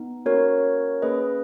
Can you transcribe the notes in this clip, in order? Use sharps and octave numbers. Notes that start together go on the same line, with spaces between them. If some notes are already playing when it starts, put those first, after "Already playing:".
Already playing: B3 D#4
A#3 C#4 F#4 A#4 C#5
A#3 C#4 G#4 B4 D#5